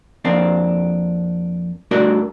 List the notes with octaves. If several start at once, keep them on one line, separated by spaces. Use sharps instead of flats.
F2 A#3 C4 D4
G2 A3 D4 F#4 A#4 D5